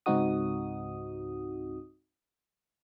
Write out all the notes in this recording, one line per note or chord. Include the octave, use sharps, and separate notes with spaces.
C#2 G#2 C4 D#4 F#4 D#6